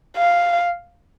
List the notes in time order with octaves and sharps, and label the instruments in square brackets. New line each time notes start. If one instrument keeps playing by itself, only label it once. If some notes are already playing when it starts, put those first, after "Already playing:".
[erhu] F5